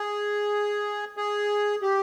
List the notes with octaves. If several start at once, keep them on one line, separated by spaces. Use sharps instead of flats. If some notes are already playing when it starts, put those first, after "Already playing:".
Already playing: G#4
G#4
G4